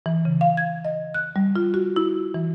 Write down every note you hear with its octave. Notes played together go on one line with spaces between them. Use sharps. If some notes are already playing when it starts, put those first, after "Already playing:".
E3
C#3
F5
G#6
D#5
F#6
G3
F4
F#4
E4
E3